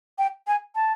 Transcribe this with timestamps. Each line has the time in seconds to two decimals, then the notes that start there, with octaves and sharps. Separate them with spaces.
0.18 G5
0.47 G#5
0.75 A5